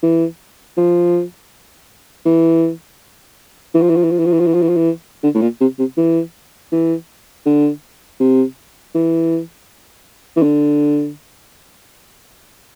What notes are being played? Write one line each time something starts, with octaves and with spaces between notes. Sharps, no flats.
E3
F3
E3
E3
F3
E3
F3
E3
F3
E3
F3
E3
F3
E3
F3
E3
F3
E3
D3
A2
A#2
C3
C3
E3
E3
D3
C3
E3
E3
D3